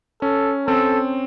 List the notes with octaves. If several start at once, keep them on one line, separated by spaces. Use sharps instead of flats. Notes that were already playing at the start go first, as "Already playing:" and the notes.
C#4 A4
C4 A4